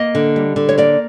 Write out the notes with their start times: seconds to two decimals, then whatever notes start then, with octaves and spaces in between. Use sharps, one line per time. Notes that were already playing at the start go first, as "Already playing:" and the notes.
Already playing: A#3 D#5
0.15 D3
0.36 G3
0.56 D3
0.69 C#5
0.78 A#3 D5